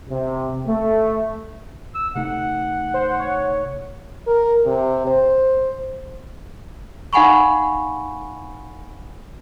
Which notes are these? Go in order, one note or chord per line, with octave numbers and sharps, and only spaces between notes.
C3
A3
E6
C3 A3 D#4 F#5
C5
C#5
A#4
C3
C5
D#4 F5 F#5 G#5 B5 C#6